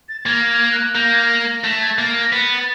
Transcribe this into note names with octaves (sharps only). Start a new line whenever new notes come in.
A6
A6
A#3 G#6
G#6
F#6
A#3 G6
G#6
A#6
A#6
A3
G#6
A#3 A6
A#6
B3 A6